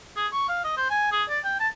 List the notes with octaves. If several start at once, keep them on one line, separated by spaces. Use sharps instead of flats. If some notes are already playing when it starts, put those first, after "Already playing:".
G#4
C#6
F5
D#5
C5
G#5
G#4
D5
G5
A5